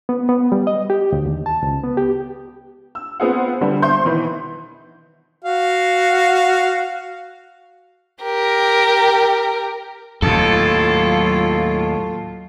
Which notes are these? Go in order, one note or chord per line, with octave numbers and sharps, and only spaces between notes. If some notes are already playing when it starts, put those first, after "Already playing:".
B3
B3
G3
D#5
G4
D2
D#2
A5
C#2
B3
G4
E6
B3 C4 F4 G#4 C5 F#5
D3 G3 B3
C5 E5 C6 C#6 G6
B2 D#3 E3 B3
F#4 F5
G4 A#4
D#2 A2 F#3 F4 A4